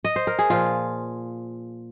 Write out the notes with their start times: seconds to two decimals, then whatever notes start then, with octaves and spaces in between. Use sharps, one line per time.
0.04 D#5
0.16 C5
0.27 A#4
0.39 G#4
0.50 A#2 F3 F4